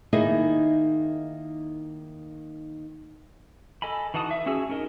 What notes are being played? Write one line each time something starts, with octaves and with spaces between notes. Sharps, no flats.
D#3 A#3 D#4 E4 G#4
A4 D#5 G#5 B5
E3 D#4 F#4 A5 D#6
E5
C#4 F#4 G#4 E6
C#4 D#4 A#4 D#5